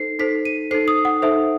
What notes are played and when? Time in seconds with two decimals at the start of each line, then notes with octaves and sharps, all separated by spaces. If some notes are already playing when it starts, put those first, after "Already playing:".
Already playing: D#4 A4 C5 C7
0.19 D#4 A4 C5 B6
0.45 D#7
0.71 D#4 A4 C5 C7
0.88 D#6
1.05 F#5
1.22 D#4 A4 C5 E5